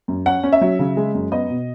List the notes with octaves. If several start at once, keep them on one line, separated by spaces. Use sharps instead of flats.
F#2
C#4 F#5
C#4
E5
F#3
C#3
G#3
F#2
B3 D#5
B2